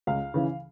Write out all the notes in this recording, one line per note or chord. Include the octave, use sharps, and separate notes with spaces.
C#2 F5
C#3 E3